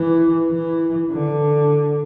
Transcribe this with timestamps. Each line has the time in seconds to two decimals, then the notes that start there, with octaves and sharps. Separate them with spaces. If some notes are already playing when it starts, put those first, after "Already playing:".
Already playing: E3
0.51 E3
1.11 D3